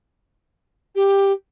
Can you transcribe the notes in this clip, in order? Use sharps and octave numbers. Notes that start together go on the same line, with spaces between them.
G4